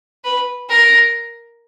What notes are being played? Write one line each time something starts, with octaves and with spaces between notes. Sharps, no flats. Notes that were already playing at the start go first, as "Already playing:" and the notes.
B4
A#4